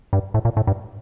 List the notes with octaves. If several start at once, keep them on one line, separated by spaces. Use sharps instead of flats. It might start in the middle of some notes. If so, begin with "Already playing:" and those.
G2
A2
A#2
A2
G2